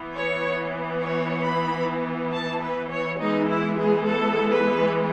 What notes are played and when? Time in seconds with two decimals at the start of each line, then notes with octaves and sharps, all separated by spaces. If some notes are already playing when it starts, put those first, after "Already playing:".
Already playing: E3 B3
0.15 C#5
1.02 C#5
1.46 B5
2.33 A5
2.62 B4
2.91 C#5
3.20 E3 G#3 B3 D#4
3.49 E4
3.79 G#4
4.08 A4
4.51 B4